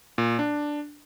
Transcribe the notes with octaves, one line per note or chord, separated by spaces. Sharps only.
A#2
D4